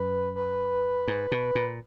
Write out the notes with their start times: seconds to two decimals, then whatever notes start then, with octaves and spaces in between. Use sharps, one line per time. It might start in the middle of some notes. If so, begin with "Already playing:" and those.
Already playing: F#2 B4
0.35 B4
1.08 G#2
1.32 B2
1.55 A#2